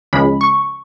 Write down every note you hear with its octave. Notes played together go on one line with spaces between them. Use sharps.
C#2 C#3 F3 G#3 B5
C#6